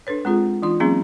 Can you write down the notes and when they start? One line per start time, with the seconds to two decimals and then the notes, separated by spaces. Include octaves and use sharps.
0.07 D4 A4 B4 C#5
0.25 G#3 C4 F4 G#4
0.62 E3 D4 D#4 F4 C6
0.80 F#3 A#3 C4 C#4 D#4 G#4